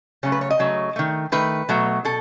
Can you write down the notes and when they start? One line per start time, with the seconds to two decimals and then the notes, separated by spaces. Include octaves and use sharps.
0.23 C#3 F#3 A3 C#5
0.32 B4
0.41 C#5
0.50 D#5
0.59 C#3 F#3 A3
0.96 D#3 A3
1.32 D#3 A3 B4
1.69 B2 F#3 A3
2.05 B2 A4